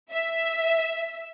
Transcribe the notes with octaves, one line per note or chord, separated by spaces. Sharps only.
E5